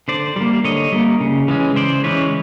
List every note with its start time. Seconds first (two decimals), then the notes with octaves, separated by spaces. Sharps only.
0.08 D3 C5 D5
0.36 G3 A#3
0.64 D3 C#5 D#5
0.92 G3 A#3
1.20 C#3
1.48 E3 G#3 C#4
1.76 C#3 C5 D5
2.04 E3 G#3 C#4 B4 C#5